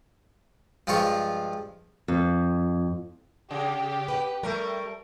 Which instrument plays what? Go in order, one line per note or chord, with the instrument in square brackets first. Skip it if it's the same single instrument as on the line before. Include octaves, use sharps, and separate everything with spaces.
[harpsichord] G2 F3 G#3 F4 C#6
[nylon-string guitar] F2
[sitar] C#3 [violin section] G4
[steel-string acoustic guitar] B4 F#5
[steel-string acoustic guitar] G3 [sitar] A3 A#4